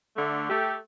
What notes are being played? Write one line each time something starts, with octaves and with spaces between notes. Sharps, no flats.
D3 A3
A3 G4